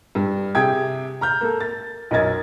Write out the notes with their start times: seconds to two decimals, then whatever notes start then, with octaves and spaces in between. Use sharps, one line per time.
0.15 G2
0.55 C3 G#4 G5 D#6 G#6
1.21 A#5 F6 G6
1.41 A#3 A4
1.60 A6
2.11 B1 F#2 A#4 D#5 G#6 A6